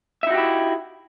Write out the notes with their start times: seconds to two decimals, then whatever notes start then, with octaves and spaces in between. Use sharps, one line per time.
0.23 E5
0.27 D#4
0.30 F#4
0.34 G4
0.38 E4